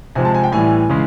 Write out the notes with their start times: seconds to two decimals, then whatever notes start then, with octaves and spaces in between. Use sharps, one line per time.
0.15 C3 F3 G#3 G#5
0.25 A5
0.34 G#5
0.43 G5
0.52 A2 E3 G3 G#5
0.89 C#3 E3 G#3